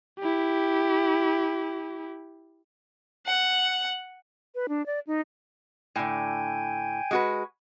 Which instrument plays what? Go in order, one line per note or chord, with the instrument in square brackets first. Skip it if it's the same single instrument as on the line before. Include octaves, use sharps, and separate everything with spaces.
[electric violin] E4 G4
[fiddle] F#5
[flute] B4
D4
D5
D#4
[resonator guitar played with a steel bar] A2 D3 [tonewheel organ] G5 G#5
[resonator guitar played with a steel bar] G#3 F#4 B4